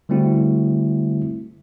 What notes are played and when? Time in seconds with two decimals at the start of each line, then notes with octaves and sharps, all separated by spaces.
0.09 D3 G3 A3 C4 E4 F#4